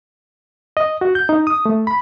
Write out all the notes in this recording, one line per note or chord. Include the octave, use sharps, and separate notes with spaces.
D#5
F#4
G6
D#4
D#6
A3
B5